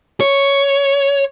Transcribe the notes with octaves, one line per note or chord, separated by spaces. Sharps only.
C#5